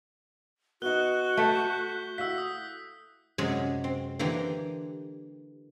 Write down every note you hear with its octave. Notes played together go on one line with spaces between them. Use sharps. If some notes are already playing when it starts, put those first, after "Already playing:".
B3 D#4 F#4 F#6 G7
A3 G6 B6
E4 F#4 F5 E6 B6
D#6 E6
F#2 C3 G#3 C#5
C4
D3 E3 A#3 G4